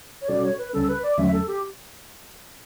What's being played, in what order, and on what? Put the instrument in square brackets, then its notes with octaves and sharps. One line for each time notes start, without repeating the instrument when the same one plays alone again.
[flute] C#5
[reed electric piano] B2 G3 C#4 F#4 A4 [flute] D5
[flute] C#5
B4
[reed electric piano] C#2 C#3 G3 C#4 [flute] A4
[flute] B4
D5
[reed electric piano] E2 D3 F#3 A3 C#4 [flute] E5
[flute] A4
G4